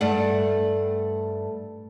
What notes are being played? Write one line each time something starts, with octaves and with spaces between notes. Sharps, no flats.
G2 A3 D5 F#5